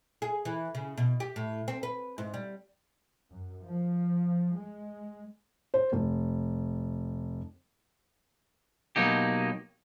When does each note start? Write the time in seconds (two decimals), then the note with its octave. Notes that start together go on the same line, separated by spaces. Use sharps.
0.22 G#4
0.45 E3
0.75 C#3
0.97 B2
1.20 G4
1.36 A2
1.68 C4
1.83 B4
2.18 G#2
2.34 G3
3.31 F#2
3.65 F3
4.57 G#3
5.74 C5
5.92 F1
8.96 B2 F#3 A#3 D#4 G4